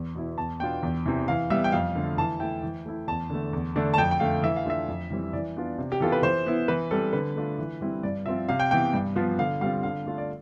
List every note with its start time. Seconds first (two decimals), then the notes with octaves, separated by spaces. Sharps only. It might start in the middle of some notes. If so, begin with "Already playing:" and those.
Already playing: E2
0.14 B2 B3 E4
0.38 E2 A5
0.60 B2 B3 D4 F4 G5
0.83 E2
1.06 C3 E3
1.28 E3 F5
1.50 G3 B3 E5
1.64 G5
1.72 F2 F5
1.95 D3 F3 A3
2.18 E3 A5
2.40 A3 E4 G5
2.63 E3
2.85 A3 E4
3.07 E2 A5
3.30 D3 A3
3.53 E2
3.76 D3 A3 D4
3.94 A5
3.98 F2 G5
4.11 G5
4.20 D3 A3 F5
4.43 E3 E5
4.56 F5
4.66 A3 D4 F4 E5
4.88 F2
5.10 E3 G3 C4 E4
5.33 E3 D5
5.56 B3 D4 F4
5.78 C3
5.92 G4
6.00 E3 B3 F4 A4
6.12 B4
6.23 E3 C5
6.46 B3 E4
6.68 E3 B4
6.91 G3 C4 A4
7.13 D3 B4
7.36 A3 D4 F4
7.58 E3
7.81 G3 C4 E4
8.03 G2 D5
8.26 F3 C4 F4 E5
8.48 C3 F5
8.60 G5
8.71 E3 B3 G5
8.94 G2
9.15 F3 B3 F4
9.38 D3 F5
9.61 G3 C4 F4 F5
9.83 D3 F5
10.06 A3 D4 F4
10.18 D5